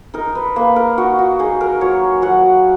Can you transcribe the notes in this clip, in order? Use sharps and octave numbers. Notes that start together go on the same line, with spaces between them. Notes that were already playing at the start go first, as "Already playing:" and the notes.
D#4 A#4
B4
A#3 B4
A#4
D#4 F#4
F#4
D#4 G#4
A#4
F#3 C#5
F#3 F#5